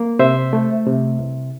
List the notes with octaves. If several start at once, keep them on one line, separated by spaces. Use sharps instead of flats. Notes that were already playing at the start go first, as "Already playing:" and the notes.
Already playing: A#3
C3 C5 E5
A3
C3
C2